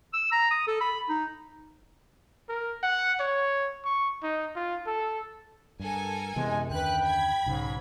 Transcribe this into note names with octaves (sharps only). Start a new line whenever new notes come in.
E6
A#5
D#6
A4
B5
D#4
A#4
F#5
C#5
C#6
D#4
F4
A4
G2 A4 A#4 G#5
F#2 C3 E3 G#3 B3
D#2 D3 D#3 B4 G5 F#6
B5 G#6
B1 G#2 C#3